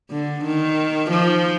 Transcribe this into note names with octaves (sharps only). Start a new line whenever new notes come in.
D3
D#3
F3